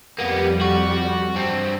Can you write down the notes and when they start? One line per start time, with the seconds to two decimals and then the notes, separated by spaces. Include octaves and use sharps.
0.19 F2 G3 A#3 B3
0.61 F#4
1.36 G2 C4